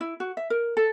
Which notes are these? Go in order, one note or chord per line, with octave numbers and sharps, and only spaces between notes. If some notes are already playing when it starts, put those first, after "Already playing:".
E4
F#4
E5
A#4
A4